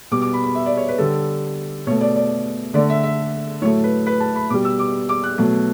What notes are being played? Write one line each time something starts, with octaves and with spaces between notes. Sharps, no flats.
B2 G3 D6
D6
B5
B5
E5
D5
C#5
B4
D3 G3 A4
B2 A3 C#5
D5
D5
D3 A3 D5
E5
E5
A2 F#3 A3 C#5
B4
B4
A5
B5
B2 G3 D6
E6
D6
D6
F#6
B2 F#3 A3